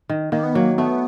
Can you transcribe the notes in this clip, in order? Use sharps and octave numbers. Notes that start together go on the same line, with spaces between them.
D#3
D#3 A#3
B3
F#3 A#3
A3 B3